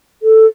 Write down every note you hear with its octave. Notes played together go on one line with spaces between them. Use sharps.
A4